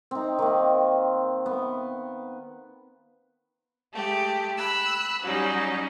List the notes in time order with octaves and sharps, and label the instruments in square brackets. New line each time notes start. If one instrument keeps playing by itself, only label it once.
[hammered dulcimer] C4 D#4
D#3 A#3
B3
[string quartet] G#3 A3 G4
B5 E6 F#6
F#3 G3 C#4 D#4